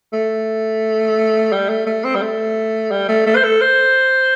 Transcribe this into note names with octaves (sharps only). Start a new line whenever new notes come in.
A3
G3
A3
A3
C4
G3
A3
G3
A3
A3
C5
A4
C5